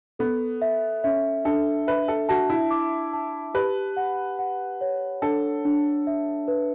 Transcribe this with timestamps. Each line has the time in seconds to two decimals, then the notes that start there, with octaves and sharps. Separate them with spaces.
0.19 B3 A4
0.62 E5
1.04 C#4 E5
1.45 D4 A4
1.87 B4 E5
2.08 A4
2.29 F#4 A5
2.50 E4
2.71 D6
3.13 A5
3.54 G4 B4
3.97 F#5
4.39 F#5
4.81 C#5
5.22 D4 A4
5.65 D4
6.07 E5
6.48 B4